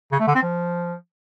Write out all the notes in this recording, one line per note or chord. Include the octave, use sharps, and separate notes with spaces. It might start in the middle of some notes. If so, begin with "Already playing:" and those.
C#3
A3
D3
C4
F3